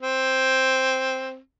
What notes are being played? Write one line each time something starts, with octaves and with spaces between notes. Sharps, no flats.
C4